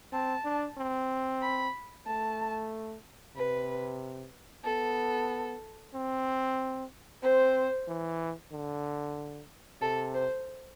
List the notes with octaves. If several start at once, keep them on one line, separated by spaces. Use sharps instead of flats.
C4 A5
D4
C4
B5
A3 A5
C3 B4
B3 A4
C4
C4 C5
E3
D3
C3 A4
C5